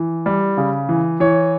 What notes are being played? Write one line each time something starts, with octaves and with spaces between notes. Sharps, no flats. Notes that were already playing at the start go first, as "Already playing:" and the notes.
Already playing: E3
G3
C#3
E3
E3 C#5